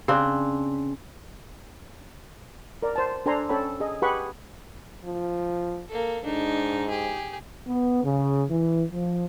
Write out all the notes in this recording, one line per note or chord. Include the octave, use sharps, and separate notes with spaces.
C#3 C4 D4
A#4 D5
C5 A5
D4 A4 C5 G#5 A#5 C6
C#4 A4 C#5 G5 B5
G#4 D#5
G4 G#4 B4 F#5 B5 C#6
F3
A#3 A4
G#2 D4 D#4
G4 G#4
B3
C#3
E3
F3